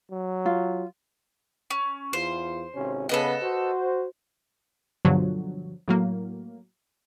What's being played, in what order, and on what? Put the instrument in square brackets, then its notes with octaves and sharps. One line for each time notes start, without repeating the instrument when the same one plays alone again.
[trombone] F#3
[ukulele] F4
[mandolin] C#4
[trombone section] E2 F4 [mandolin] C5
[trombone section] G#1 C3 C#4
[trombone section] C#3 B3 [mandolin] A4 B4 D#5
[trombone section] F#4 C5
[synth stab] G2 B2 D3 F3 F#3
A2 F#3 A#3